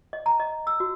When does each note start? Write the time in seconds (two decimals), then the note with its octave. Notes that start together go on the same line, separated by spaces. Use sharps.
0.13 D#5
0.26 A#5
0.40 D#5
0.67 E6
0.80 F#4